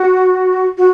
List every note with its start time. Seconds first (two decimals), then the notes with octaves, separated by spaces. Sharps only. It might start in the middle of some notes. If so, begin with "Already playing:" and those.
Already playing: F#4
0.78 F#4